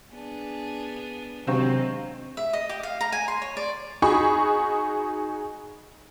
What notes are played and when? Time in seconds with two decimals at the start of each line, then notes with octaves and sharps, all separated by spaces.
0.11 B3 D4 G#4
1.47 C3 D#3 F#3 G#3 C4 D4 F5 C#6
2.37 E5
2.53 D#5
2.69 G4
2.83 F5
3.01 A#5
3.12 G#5
3.28 C6
3.42 C#5
3.57 D5
4.02 D#4 F#4 G#4 B5 C#6 D#6